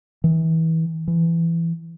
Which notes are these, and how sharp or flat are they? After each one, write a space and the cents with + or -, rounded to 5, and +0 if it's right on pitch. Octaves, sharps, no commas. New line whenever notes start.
E3 -30
E3 +20